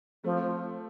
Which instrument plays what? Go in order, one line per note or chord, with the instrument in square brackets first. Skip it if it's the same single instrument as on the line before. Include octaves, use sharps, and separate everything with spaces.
[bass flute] F3 [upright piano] A3 C4